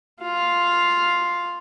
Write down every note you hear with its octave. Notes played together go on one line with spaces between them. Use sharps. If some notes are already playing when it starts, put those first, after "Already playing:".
F4 F5